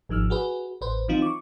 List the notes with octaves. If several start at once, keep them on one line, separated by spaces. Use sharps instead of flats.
G#1 F3 D#4 E6 F6
F#4 G#4 B4
A1 B4 C5
E3 F#3 C4 D#4 F4
C#6 D6